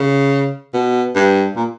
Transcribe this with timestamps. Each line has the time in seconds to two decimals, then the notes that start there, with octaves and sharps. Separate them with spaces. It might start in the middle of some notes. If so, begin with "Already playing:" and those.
Already playing: C#3
0.74 B2
1.15 G2
1.56 A#2